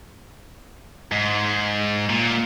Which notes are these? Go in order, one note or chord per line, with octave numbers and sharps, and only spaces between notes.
G#2
A#2